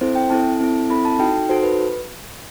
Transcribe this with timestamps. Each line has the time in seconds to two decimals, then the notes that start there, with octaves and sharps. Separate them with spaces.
0.01 C4 E4 A4 C5
0.15 G5
0.30 C4 E4 A4 A5
0.61 C4 E4 A4
0.89 C4 E4 A4 B5
1.05 A5
1.19 D#4 F#4 A4 G5
1.49 D#4 F#4 A4 C5
1.63 B4